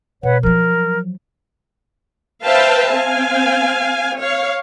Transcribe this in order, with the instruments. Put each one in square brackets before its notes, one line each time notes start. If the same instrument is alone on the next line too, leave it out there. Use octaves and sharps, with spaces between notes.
[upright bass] B2 [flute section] B4 C#5 F#5
[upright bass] F3 F#3 [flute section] A#4
[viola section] B4 C5 E5 F5 G5 A5
C4 F5 G#5
C#5 F5